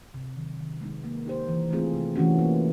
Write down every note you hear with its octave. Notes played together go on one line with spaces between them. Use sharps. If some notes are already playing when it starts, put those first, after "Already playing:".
C3
D#3 F#3
D#3
G#3 B3 D#4
A#3
D#4 G4 C5
E3
A3 C4 F4 G#4
C3
E3 A3 C#4 F#4
A#3